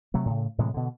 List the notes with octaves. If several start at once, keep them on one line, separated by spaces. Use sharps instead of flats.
C3 F#3 A3
A2 C#3
A2 C3 E3 G#3
B2 D3